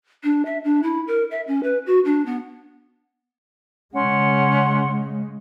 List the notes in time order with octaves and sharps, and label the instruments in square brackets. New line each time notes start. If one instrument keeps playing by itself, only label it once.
[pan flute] D4
E5
D4
E4
A#4
E5
C#4
B4
F#4
D4
B3
[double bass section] C#3 G#3 [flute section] C#4 F#5 C6